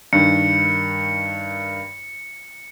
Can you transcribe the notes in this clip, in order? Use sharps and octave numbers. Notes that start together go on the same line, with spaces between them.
G2 D#3 C#7